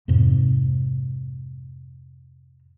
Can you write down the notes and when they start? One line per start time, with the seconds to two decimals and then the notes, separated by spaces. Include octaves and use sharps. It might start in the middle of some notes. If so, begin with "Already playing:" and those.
0.08 F2 G#2 C3